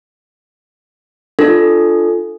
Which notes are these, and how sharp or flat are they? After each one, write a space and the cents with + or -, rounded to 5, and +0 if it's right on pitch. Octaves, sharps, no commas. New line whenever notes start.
D4 +25 F4 +0 A4 +0